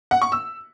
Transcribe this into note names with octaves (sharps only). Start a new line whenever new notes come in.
F#5
C#6
E6